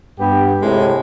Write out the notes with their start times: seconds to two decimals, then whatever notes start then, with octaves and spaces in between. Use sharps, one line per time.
0.19 G2 B3 G4
0.62 A2 C3 G#3